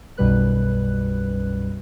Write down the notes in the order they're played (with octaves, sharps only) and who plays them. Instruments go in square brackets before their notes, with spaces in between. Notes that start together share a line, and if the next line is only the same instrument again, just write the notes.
[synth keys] B1 F#2 B2 G3 B4 F#6